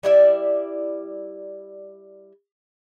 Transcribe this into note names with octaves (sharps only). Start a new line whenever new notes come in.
G3 E4 D5 E5